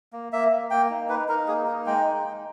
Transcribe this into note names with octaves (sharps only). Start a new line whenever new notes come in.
A#3
A#3 E5
A#3
A#3 G5
D#4
D#4 B4
D#4 A#4
A#3 G#4
D#4 A#4
G#3 G5
G#3
D#4